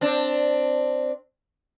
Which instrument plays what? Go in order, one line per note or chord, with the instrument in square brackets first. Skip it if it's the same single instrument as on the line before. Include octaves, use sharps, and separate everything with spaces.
[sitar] C4 D4